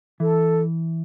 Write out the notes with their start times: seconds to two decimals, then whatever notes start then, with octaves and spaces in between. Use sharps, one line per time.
0.19 E3 A4